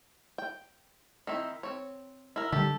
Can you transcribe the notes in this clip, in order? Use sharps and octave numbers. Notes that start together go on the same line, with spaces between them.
G5
D#3 C4 E4
C4 C#5
E4 A#4
D3 F3 G3 G4 A4